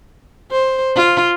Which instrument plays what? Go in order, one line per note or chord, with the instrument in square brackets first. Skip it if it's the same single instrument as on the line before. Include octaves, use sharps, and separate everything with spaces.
[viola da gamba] C5
F4